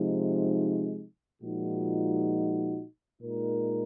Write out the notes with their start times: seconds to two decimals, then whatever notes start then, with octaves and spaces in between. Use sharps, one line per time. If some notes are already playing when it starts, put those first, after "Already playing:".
Already playing: C3 F3 G#3 D#4
1.40 A#2 F3 G#3 D#4 F#4
3.19 A#2 G#3 D#4 A#4